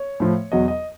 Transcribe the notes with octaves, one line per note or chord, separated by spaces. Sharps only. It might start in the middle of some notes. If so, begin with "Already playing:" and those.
Already playing: C#5
A2 F3
E2 B2 F#3 D#5
D#5